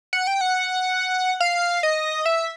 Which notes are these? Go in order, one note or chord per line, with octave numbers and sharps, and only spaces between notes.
F#5
G5
F#5
F5
D#5
E5